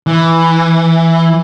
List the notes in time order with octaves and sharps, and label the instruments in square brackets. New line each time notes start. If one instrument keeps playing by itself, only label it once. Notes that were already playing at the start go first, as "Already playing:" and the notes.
[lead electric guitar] E3